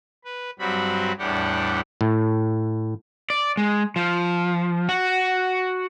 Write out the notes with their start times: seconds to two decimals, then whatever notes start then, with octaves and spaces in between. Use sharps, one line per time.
0.24 B4
0.59 G2 F#3 G3 C4 F#4 B5
1.19 E2 A2 G3 D4 G4 F#5
2.01 A2
3.30 D5
3.57 G#3
3.96 F3
4.89 F#4